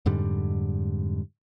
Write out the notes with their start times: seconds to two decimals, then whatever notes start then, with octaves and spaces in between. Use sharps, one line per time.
0.06 F2 G#2 D3 G3